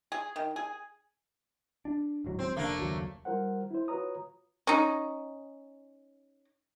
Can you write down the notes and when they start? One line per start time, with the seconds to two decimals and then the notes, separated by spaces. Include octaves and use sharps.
0.12 G#4
0.36 D#3
0.56 G#4
1.85 D4
2.24 D1 G#2 F#3
2.39 C4
2.56 F1 A3 A#3 D4
2.79 F#1 D#2 F#3
3.25 G3 F4 A#4 C5 F#5
3.71 E4 C5
3.88 F4 F#4 B4 C#5 A#5 D#6
4.67 C#4 D#4